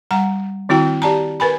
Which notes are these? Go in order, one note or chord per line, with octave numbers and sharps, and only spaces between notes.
G3 F#5 A#5
D#3 C4 E4 F#4 G5
G4 D5 A5 A#5
A#4 B4 G#5 B5